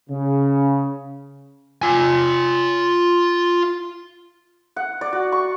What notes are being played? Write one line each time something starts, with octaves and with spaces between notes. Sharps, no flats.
C#3
F4 G#5
F#5
D5
F#4
C#6